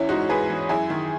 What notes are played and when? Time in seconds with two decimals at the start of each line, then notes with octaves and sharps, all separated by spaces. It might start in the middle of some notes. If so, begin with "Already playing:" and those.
Already playing: E2 E3 C#4 E4
0.09 G#2 D#4 F#4
0.29 G#2 G#4 B4
0.50 E3
0.69 F#2 E4 G#4
0.90 D#3